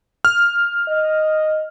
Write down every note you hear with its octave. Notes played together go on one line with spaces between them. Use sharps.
F6
D#5